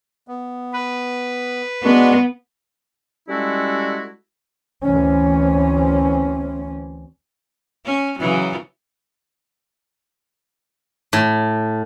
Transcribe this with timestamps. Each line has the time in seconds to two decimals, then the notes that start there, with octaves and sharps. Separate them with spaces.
0.28 B3
0.73 B4
1.84 G#3 B3 D4 F#4
3.29 G3 G#3 C#4 E4 F#4 A4
4.84 D2 E3 C4 C#4
7.85 C#4
8.19 C#3 E3 F#3
11.13 A2